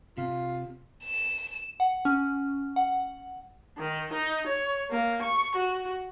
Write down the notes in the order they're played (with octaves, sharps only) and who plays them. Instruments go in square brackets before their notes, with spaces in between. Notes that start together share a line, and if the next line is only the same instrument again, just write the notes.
[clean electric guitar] C3 [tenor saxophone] F4
[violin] E7
[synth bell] F#5
C#4
F#5
[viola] D#3
D#4
C#5
A#3
C#6
F#4